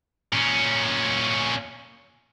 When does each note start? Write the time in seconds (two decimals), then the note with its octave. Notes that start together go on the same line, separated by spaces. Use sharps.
0.33 A#2 C#4